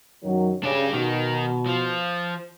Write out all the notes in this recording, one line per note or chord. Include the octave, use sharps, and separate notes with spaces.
F#2 D#3 F#3
C#3 D4 G4
B2 D#3
F3